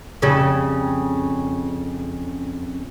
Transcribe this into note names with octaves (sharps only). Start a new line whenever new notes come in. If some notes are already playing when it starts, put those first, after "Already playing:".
F2 C#3 G3